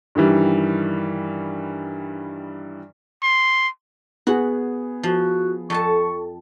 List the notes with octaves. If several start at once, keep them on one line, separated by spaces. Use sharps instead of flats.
G2 D#3 E3 G3
C6
B3 F#4 G#4
F3 F#4
F2 A4 A5 C#6